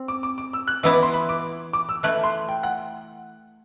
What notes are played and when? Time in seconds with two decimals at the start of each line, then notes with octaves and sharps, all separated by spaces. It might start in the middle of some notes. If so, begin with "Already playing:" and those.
Already playing: C4
0.08 D6
0.23 D6
0.38 D6
0.53 E6
0.67 F#6
0.83 E3 B3 E4 E6
0.93 D6
1.03 C6
1.13 B5
1.29 D6
1.73 D6
1.89 E6
2.03 E3 A3 E4 F#6
2.24 C6
2.49 G5
2.63 F#5